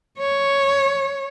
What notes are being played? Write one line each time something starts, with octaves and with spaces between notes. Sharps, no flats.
C#5